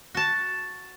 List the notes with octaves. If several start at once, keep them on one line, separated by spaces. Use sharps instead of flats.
F#4 A5